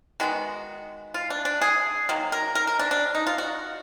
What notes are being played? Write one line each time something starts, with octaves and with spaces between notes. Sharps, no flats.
D#3 G#3 B3 F#4
F4
D4
D4
G#4
D#3 F#3 A#3
A#4
A#4
A#4
D4
D4
D#4
F4
F#4